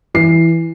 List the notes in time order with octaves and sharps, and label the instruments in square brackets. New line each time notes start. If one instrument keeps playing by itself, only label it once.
[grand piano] E3 C7